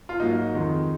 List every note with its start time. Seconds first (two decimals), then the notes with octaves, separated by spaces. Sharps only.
0.09 F4
0.20 G#2 F#3 A#3 D#4
0.55 F2 D#3 G#3